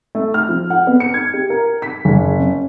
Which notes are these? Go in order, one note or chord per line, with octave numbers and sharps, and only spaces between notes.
A3
F6
F3
F#5
B3
C#7
G#6
G4
A#4
B6
F#1
C#4